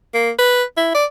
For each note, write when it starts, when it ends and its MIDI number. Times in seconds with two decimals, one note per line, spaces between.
0.14 0.31 58
0.39 0.64 71
0.77 0.91 64
0.95 1.05 74